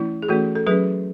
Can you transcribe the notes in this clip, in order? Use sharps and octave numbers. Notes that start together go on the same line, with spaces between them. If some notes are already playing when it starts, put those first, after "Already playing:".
Already playing: E3 A3 C#4 E4
G#4
E3 A3 C#4 F#4 A4
A4
F#3 C#4 G#4 B4